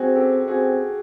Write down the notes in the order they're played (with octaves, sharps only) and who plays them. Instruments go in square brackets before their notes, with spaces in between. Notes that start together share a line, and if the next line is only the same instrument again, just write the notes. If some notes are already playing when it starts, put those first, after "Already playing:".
Already playing: [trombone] C4 [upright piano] F#4 G#4
[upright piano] G4 A4
[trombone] C4 [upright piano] F#4 G#4